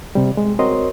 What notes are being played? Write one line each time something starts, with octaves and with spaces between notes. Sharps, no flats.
C3 G3
G#3
C4 F#4 A#4 C#5 D#5 C6